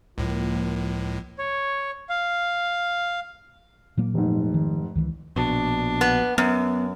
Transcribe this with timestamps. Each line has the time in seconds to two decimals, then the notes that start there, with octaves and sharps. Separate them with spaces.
0.18 C#2 A2 F3 A#3
1.38 C#5
2.09 F5
3.97 A#2 F#3 A#3
4.14 F1 G#2
4.54 D#3
4.95 C#2 D#3 E3
5.36 A#1 B2 D4
6.01 B3
6.38 F#2 B3